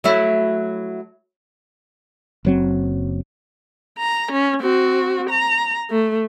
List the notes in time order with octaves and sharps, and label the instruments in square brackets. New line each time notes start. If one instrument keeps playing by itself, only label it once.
[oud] F#3 A3 E4
[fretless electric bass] F#1 F#3 C4
[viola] A#5
C#4
C4 F#4
A#5
A3